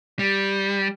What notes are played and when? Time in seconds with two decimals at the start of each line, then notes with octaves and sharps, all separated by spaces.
0.19 G3